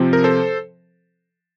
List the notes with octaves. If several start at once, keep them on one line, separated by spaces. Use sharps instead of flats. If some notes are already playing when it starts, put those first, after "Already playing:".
Already playing: C3 F3 C4
A#4
A4 C5